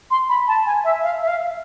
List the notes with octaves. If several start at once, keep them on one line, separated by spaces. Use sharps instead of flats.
C6
B5
A5
G#5
E5
F5
E5
F5